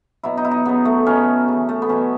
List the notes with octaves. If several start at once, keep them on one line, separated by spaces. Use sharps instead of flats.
B2 F#3 E4
D#4
E4
D#4
C#3 F#3 B3
A3
B2 F#3 C#4
C#3 E3
A3
B3
B2 F#3 C#4